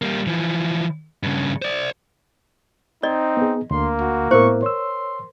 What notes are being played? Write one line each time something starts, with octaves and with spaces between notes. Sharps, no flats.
G3 A#3
E3 F3
G2 C#3
C5 D5
C4 D#4 D5 D#5
B3 G#4
D2 D3 A#3 C6
F#4
A2 B3 E4 A#4 C5 C#6
C#5 C6 E6